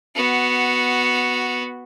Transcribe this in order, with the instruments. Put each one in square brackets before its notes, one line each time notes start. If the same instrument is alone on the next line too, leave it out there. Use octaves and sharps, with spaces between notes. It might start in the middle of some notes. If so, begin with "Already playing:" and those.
[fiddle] B3 F#4